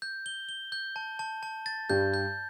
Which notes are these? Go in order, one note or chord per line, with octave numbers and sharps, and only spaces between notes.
G6
G7
G7
G6
A5
A5
A5
A6
G2 G3 G6
G6